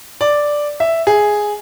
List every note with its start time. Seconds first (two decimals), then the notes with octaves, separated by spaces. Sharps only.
0.21 D5
0.80 E5
1.07 G#4